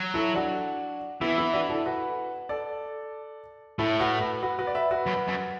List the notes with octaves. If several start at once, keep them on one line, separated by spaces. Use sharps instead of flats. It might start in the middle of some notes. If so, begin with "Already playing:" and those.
Already playing: F#3
E4 A4
D4 F#4
E3 B3 E4
B3 E4
D4 F#4
E4 A4
F#4 B4
A4 D5
A2 E4 A4
F#4 B4
F#4 B4
F#4 B4
F#4 B4
D5
B4 E5
F#4 B4
F#2
F#2